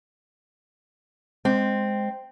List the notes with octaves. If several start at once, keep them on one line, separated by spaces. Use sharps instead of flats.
G#3 C4